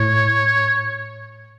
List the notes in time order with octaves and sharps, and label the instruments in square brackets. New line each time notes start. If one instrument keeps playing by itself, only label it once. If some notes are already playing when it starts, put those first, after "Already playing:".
Already playing: [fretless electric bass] A2 [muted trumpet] C#5